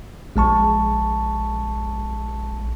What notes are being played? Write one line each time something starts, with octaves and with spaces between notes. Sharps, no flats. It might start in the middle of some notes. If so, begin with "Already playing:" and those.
A#1 G#3 A5 C#6